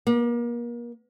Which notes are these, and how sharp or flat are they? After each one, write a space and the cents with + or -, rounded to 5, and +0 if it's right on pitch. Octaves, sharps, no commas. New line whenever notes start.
A#3 +35